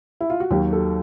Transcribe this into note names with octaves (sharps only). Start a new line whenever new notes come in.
E4
F4
F#4
D#2 D#3 F#3 G4
A4